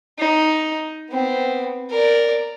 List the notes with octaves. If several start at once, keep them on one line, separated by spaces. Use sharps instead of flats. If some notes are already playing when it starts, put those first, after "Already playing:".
D#4
B3 C4
A#4 D5